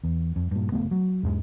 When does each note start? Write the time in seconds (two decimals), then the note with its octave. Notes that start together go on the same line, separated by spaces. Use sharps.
0.04 E2
0.36 F2
0.51 G2 A#2
0.72 F#1 G2 A3 B3
0.91 F#3
1.23 E2 G#2 G#3